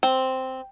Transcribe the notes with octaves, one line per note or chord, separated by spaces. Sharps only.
C4